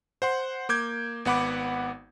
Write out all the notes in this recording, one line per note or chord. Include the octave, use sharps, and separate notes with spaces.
C5 F#5 C6
A#3 D6 G6 G#6
G#1 B3 F#5 B5 D6